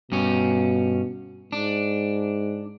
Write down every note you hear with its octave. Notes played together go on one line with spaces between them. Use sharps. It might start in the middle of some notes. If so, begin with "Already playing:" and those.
G2 B2 C#4
G#2 D4